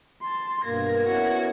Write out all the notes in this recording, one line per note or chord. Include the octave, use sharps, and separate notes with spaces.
A5 C6
G2 B2 A#3 A#4 G#6 A#6
B3 C#4 E4 F#4